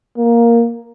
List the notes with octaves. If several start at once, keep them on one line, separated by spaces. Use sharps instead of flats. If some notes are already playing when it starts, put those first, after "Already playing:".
A#3